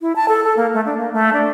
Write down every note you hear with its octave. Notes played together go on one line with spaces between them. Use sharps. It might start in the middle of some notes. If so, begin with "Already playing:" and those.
E4
A5
A4
A4
A#3
A3
D4
A#3
A3
D4